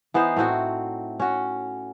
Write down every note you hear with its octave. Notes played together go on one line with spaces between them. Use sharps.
E3 B3 D#4 C5
A2 A3 C4 F#4
C#4 F#4